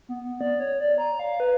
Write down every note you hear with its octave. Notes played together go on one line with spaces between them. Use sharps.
B3
D5
C#5
D5
A#5
F5
B4